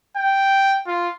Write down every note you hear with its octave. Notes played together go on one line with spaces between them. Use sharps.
G5
F4